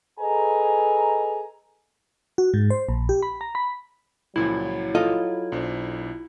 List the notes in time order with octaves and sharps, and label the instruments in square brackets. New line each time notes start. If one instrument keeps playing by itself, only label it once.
[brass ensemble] G#4 A4 B4 D#5 G#5 A#5
[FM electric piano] F#4
G#2
C5
A#1
G4
B5
A#5
B5
[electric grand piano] C#2 A#2 F3 [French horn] F#3 [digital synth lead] E4
[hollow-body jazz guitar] F4 A4 D#5
[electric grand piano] B1 D4 C5